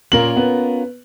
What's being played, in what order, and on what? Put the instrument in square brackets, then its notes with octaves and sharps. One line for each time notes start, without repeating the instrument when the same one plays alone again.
[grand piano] A#2 A#3 F#7 [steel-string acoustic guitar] C#4 F4 A#4
[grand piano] B3